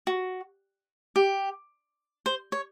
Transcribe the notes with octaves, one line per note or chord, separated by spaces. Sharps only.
F#4
G4
C5
C#5